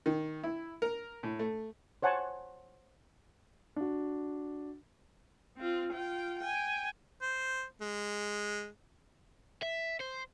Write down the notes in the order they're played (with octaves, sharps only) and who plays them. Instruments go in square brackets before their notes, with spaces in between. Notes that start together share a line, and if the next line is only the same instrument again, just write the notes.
[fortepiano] D#3
E4
A#4
A2
A3
[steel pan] C5 C#5 F#5 G#5 A5
[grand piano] D4 F#4
[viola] C4 F4
F4 G5
G5 G#5
[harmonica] C5
G#3
[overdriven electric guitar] E5
C5